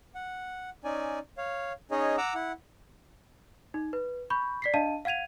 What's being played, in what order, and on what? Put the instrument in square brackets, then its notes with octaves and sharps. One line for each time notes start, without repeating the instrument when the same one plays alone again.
[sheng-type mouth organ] F#5
C#4 D#4 D5 G#5
C#5 F5
C#4 D#4 G#4 C#5 D#5
F#5 A#5 D6 E6
E4 F#5
[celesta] D#4
B4
B5 C#6 G6
D5 B6 C7
D4 D#5 F5 A5 D#7
F5 F#5 G#6 D#7 F7